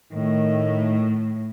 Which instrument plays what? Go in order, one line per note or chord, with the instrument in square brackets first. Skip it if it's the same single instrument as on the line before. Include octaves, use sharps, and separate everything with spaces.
[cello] A2 A3 [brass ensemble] D#3